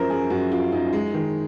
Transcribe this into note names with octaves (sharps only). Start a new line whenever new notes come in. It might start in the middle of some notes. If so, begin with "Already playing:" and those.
Already playing: F#2 F3 A#4 C5
F#2 G#4
F#2 F#4
F#2 F4
F#2 D#4
G#3
D#3